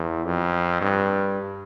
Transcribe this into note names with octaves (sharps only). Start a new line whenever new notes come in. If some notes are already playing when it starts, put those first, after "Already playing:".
Already playing: E2
F2
G2